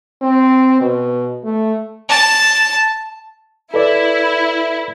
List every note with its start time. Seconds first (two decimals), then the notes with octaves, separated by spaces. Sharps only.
0.22 C4
0.81 B2
1.44 A3
2.09 A5
3.74 E4 A4 B4 D5